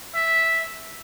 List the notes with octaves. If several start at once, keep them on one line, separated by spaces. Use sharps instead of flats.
E5